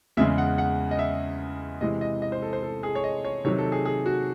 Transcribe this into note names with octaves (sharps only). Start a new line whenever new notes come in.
E2 C#3 G#3 E5
F#5
F#5
D#5
E5
C3 E3 G#3 D#5
D#5
D#5
C5
A4
C5
A4
G#4
C#5
D#5
C#5
C3 D#3 F#3 C#5
A4
G#4
G#4
F#4